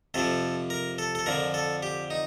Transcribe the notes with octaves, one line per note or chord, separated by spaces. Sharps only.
F2 C3 F3 A4
A#4
A4
A4
F2 D3 F3 A#4
A4
G4
D#4